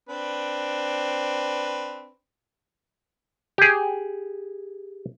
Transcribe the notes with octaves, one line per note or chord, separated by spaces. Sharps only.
C4 D4 B4
G4 G#4